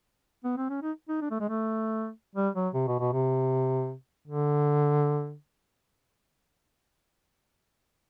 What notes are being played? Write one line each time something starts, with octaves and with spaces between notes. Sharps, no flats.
B3
C4
C#4
D#4
D#4
D4
A3
G#3
A3
G3
F#3
C3
B2
B2
C3
D3